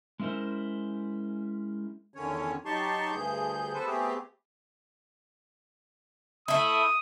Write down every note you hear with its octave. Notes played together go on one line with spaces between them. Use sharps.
G#3 C#4 E4 A#4 C5
E2 D3 D#3 C#4 C#5
F#3 D#4 G4 A5 C6 C#6
D2 G2 G#4 G6
B3 A4 B4 C5
A3 B3 C4 G4 G#4
A3 E4 D#6